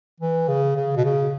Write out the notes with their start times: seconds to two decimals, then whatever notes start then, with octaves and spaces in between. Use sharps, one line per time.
0.20 E3
0.48 C#3
0.76 C#3
0.97 B2
1.05 C#3